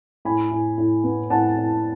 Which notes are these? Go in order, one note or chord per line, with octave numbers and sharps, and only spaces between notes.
A2 G#5 B5
A2
A2
B3
A2 F#5 A5
A2